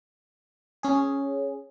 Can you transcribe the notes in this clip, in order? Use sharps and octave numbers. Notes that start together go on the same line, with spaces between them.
C#4 G#4